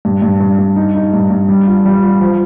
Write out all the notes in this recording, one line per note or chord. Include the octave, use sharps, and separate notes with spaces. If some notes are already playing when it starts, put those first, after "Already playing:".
G2
G2
G2
G2
D#4
D#4
G2
G2
G3
F4
G3
F4
F3